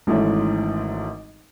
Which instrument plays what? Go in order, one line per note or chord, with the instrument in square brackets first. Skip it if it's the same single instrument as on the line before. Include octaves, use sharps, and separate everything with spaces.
[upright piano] G#1 G#2 E3 A3 C#4